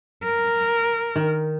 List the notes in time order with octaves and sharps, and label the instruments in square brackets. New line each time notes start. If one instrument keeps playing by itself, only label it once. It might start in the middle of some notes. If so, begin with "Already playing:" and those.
[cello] A#4
[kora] D#3